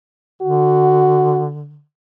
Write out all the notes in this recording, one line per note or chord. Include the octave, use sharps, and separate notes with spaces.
D3 F#4